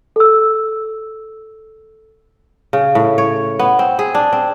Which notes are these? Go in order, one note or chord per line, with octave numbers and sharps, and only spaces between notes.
A4 E6
C#3
A2
C#5
B3
C4
G#4
D4
C4